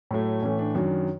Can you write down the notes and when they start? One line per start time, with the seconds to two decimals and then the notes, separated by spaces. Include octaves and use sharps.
0.11 A2 F#3 A3
0.42 A2 E3 A3 C#4
0.59 D4
0.74 F#2 D#3 F#3 D4